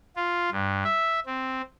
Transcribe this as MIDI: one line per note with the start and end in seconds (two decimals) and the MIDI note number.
0.16 0.50 65
0.52 0.84 43
0.84 1.20 76
1.26 1.62 60